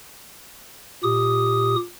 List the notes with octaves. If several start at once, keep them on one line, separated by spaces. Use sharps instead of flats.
A#2 G4 D#6